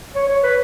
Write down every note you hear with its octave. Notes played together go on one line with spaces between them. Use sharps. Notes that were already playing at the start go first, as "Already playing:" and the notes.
C#5
C#5
B4